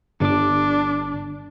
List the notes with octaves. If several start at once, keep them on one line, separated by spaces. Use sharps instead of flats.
G1 D4 D6